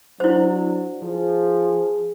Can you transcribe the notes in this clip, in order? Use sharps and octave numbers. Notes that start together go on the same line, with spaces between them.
F#3 D4 E4 C5
F3 G#4